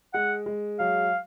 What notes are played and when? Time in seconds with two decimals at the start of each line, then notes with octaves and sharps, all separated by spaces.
0.14 G#3 F#5
0.46 G#3
0.79 F#3 F5